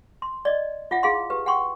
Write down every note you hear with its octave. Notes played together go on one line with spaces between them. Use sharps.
C6
D5 D#5
F4 E5 F#5
E4 G#4 F5 C6
G4 B4
F#5 G5 C6 C#6